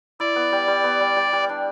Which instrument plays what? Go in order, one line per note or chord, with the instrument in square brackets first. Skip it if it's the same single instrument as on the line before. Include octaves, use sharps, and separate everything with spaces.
[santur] E4 [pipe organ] D5
[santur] B3
G3
G3
B3
G3
G3
G3
D4